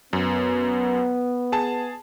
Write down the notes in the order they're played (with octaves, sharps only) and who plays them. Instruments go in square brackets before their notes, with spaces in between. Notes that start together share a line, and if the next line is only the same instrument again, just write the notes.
[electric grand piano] F#2 [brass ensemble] B3
[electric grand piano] G#4 A5